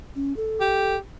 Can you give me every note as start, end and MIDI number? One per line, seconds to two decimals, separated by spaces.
0.15 0.35 61
0.36 0.96 69
0.61 0.98 67